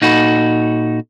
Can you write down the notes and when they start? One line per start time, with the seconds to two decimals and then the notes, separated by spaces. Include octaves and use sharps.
0.02 A#2 D#4 F#4 A4 B5